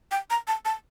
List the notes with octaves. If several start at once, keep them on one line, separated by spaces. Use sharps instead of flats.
G5
A#5
A5
A5